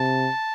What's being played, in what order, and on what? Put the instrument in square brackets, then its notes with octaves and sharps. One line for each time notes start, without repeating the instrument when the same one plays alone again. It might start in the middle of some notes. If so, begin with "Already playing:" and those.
Already playing: [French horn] C3 [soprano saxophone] A5